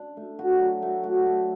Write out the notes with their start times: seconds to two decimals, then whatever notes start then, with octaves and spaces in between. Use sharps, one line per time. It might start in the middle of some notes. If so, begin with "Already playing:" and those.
Already playing: D4
0.17 A3
0.39 F#4
0.60 F#3
0.82 A3
1.04 F#4
1.26 A3